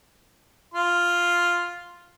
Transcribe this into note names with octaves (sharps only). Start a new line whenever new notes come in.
F4 C6